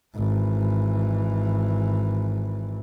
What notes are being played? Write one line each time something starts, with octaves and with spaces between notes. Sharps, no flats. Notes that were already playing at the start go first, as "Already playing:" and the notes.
G#1 E3